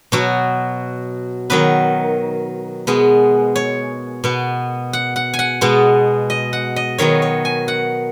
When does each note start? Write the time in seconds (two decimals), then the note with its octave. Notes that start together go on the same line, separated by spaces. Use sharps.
0.12 B2 F#3 B3 F#4
1.50 D#3 F#3 B3 B4
2.87 B2 G#3 B3
3.56 C#5
4.24 B2 B3
4.93 F#5
5.16 F#5
5.34 G#5
5.39 F#5
5.61 B2 G#3 B3
6.30 D#5
6.53 F#5
6.76 D#5
6.98 D#3 F#3 B3 C#5
7.22 C#5
7.45 G#5
7.68 F#5